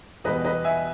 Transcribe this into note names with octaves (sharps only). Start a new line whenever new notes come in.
E2 B2 G3 B4 D#5
B4 D#5
E5 G#5